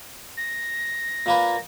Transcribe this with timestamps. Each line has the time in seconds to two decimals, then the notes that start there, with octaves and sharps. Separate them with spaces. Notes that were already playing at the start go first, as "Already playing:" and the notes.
0.37 A#6
1.26 A#2 A#3 B4